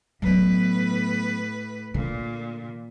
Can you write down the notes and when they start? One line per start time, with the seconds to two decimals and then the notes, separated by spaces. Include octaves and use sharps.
0.22 A2 F#3 B3 B4
1.94 A#2 D3